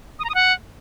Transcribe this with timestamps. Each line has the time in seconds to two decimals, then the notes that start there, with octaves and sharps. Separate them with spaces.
0.19 D#6
0.24 A#5
0.29 D#6
0.35 F#5